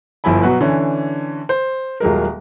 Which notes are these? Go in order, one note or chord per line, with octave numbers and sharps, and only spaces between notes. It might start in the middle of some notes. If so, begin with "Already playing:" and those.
G1 F3 E4 G#5 B5
B2 F#3 F#4 B4
D3 E3 C#4
C5
D#1 F#3 G#3 A#4